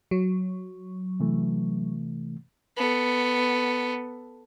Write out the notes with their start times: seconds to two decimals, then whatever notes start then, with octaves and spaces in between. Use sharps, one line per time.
0.11 F#3
1.20 C3 E3 A3
2.77 B3 A4